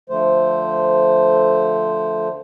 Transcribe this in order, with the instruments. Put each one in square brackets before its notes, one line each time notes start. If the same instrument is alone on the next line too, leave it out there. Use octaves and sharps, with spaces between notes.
[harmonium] D3 F3 A3 C5